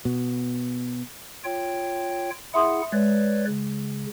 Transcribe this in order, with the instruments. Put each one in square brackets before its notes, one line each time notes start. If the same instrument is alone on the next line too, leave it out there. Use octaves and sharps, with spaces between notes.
[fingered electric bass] B2
[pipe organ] F4 C#5 G5
[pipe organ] E4 G#4 F#5 [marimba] E5 C6 D#6
[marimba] G#3 [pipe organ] B4 C#5 D5
[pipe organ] C#3